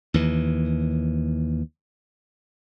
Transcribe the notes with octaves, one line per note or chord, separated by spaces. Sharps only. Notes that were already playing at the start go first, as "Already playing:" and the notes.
D#2 E3